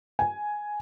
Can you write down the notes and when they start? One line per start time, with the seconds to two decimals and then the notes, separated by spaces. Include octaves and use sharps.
0.19 G#5